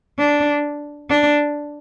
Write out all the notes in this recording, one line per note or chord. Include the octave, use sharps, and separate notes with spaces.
D4
D4